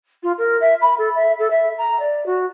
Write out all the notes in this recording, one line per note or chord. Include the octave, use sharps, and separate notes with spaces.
F4
A#4
E5
B5
A4
E5
A4
E5
A#5
D5
F#4